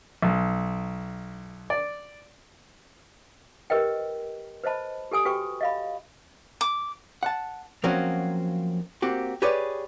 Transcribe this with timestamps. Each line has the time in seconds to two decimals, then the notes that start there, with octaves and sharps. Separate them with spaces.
0.22 B1
1.70 D5
3.70 G4 A#4 B4 D#5 G5
4.64 B4 C5 D#5 A5 B5
5.11 G4 A4 G#5 D#6
5.25 F#4 G4 B4 G5 C#6
5.61 D#5 F5 B5
6.61 D6
7.23 F#5 A5
7.84 F3 F#3 A#3 C4 C#4 F#4
9.02 A#3 C4 F#4 G4
9.42 G4 G#4 B4 C#5 D5